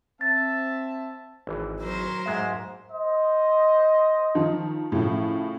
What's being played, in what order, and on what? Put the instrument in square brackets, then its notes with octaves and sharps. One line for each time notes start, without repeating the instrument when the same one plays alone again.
[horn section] C4 E5 A5 [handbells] A6
[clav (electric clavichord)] G#1 E3
[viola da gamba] F#3 A#4 C5
[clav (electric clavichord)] G#2 G#3 E5
[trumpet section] C5 D#5
[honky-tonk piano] D#3 F3
A2 C#3 F3